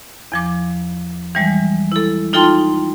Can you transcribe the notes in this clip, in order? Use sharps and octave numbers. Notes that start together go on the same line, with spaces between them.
E2 F3 D6
E3 G3 G#3
E4 A4
D#4 F4 A4 G5 A5 C6